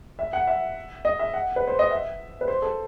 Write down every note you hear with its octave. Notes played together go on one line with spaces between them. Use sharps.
E5
F#5
E5
D#5
E5
F#5
B4
C5
D#5
E5
B4
C5
A4